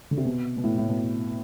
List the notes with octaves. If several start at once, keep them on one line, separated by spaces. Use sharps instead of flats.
D3
C3
B2
B2
A2
A2
B2